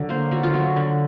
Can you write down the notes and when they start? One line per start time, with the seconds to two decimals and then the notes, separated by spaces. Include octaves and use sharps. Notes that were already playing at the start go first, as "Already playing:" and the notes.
Already playing: D3 F#3
0.09 A#3 C5
0.31 D3 F#4
0.43 F4
0.54 F#3 F#4
0.76 D3